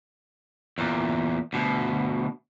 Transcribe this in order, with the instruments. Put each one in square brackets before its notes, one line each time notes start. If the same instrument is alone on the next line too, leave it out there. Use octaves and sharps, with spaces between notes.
[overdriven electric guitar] E2 A#2
D2 B2